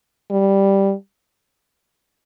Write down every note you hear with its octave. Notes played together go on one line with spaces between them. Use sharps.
G3